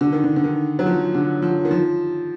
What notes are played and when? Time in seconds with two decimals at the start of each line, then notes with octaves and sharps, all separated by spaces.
0.01 D3
0.12 D#3
0.24 D3
0.36 D3
0.44 D#3
0.79 F#3
0.86 F3
1.15 D3
1.42 F3
1.65 D#3
1.71 F3